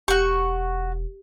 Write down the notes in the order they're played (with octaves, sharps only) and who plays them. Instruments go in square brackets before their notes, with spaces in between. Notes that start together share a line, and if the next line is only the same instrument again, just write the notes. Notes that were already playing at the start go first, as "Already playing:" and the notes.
[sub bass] E1 [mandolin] F#4 C#6 [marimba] G4